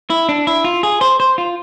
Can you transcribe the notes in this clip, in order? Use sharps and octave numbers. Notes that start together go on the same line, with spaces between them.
E4
D4
E4
F4
G#4
C5
C5
F4